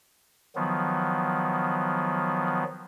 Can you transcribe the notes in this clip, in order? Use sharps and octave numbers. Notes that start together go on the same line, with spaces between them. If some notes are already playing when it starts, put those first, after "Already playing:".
D#3 F3 F#3 B3